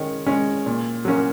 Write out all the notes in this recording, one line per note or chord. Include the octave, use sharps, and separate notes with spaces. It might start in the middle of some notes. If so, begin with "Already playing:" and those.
Already playing: D#3 G#3 C#4
G#3 C#4
A#2
F#3 A#3 C#4